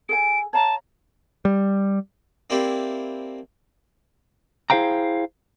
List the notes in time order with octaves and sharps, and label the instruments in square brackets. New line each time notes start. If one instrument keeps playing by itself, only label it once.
[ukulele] G#4 A4 G#5 [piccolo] D7
[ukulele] C#5 F5 A#5 [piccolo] A5
[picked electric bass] G3
[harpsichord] A#3 C4 D4 E4 G4
[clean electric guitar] E4 G#4 C5 F5 G5 A#5